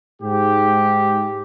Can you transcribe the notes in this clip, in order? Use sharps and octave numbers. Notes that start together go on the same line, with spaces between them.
G#2 G4